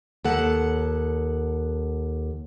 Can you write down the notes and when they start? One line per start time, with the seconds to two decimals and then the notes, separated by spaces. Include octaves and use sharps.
0.25 D#2 A4 F#5